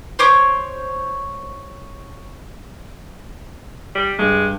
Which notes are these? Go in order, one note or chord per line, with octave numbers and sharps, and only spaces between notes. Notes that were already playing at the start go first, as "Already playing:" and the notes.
C5 C#5 D6
G3
G2 G#3